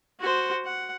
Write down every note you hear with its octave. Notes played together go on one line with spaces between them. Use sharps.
F#4 C5
F#5